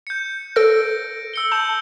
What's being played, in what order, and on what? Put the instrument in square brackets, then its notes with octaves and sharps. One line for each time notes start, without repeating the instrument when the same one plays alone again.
[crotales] G6 C#7
[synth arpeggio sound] A4 E6 [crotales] A#6 D7
[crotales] E6 C#7 G7
[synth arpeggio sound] A5 [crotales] G6